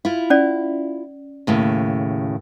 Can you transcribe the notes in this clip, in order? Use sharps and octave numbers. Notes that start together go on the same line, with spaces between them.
E4 F4
C#4 D5
D#2 A2 C#3